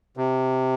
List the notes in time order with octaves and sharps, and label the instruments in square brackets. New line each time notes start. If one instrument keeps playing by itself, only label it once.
[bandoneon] C3